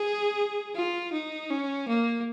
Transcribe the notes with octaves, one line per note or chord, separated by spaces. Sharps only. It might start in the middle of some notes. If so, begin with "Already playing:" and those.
Already playing: G#4
F4
D#4
C#4
A#3